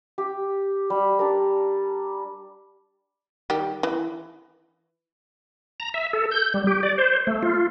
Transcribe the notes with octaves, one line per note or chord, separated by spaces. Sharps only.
G4
G3
D4 A#4
D#3 G3 G4
E3
A#5
E5
A4
G6
G3
G4
D5
C5
A3
F4